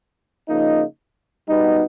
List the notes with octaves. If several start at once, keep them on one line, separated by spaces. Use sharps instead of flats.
C#3 F3 A#3 D#4
B2 G3 B3 D#4